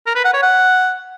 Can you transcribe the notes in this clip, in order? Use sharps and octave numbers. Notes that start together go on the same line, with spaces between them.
A#4
B4
F#5
C#5
F#5